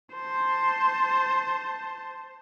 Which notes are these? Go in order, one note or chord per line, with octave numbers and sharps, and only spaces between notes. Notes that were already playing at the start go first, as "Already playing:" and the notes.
C5 A5